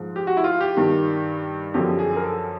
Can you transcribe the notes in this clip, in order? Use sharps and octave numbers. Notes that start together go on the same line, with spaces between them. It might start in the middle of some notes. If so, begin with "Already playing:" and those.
Already playing: G#2 F3
G4
F#4
E4
F4
G4
G2 D#3
F#2 D3 F3 G4
G#4
A#4
A4